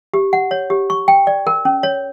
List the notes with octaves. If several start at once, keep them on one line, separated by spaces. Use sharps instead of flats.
G4
F#5
C#5
G4
C#6
G5
D5
A#4
C#4
C#5